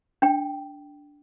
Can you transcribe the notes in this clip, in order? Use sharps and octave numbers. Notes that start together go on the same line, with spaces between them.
D4 G5